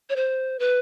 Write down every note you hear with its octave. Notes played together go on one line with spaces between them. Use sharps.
C#5
C5
B4